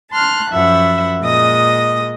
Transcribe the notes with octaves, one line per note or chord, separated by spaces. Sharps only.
A5 C6 F6 F#6
F#2 F3 E5 F#5 B5
A#2 G#3 D#5 D#6